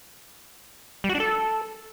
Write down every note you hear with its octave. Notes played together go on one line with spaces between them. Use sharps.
G3
F#4
D4
A4